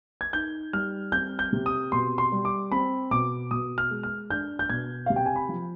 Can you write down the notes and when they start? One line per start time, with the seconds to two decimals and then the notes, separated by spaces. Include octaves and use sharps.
0.21 G#6
0.33 D#4 G6
0.73 G3 F6
1.12 C4 G6
1.39 G6
1.53 C3
1.66 D#6
1.92 B2 C6
2.18 C6
2.32 G3
2.45 D6
2.72 C4 B5
3.11 B2 D6
3.51 B2 D#6
3.78 F6
3.90 G#3
4.03 F6
4.30 D4 G6
4.59 G6
4.69 B2 G#6
5.06 C3 F5
5.16 G5
5.26 G#5
5.36 B5
5.49 F3